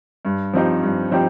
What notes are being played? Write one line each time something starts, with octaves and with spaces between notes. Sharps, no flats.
G2
F3 C4 D#4 G4
G2
F3 C4 D#4 G4